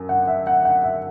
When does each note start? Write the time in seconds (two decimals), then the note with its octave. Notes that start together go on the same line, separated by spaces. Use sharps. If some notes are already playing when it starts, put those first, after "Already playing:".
Already playing: F#2
0.09 F#5
0.28 E5
0.47 F#5
0.65 F#5
0.84 E5